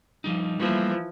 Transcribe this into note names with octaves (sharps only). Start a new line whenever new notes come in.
F3 G3 D#4
E3 F3 G3 A3 A#3